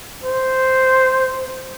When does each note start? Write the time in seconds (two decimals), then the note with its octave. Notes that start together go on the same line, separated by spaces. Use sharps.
0.24 C5